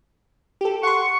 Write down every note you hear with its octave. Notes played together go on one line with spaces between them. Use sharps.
G4 A4
F#5 C6 C#6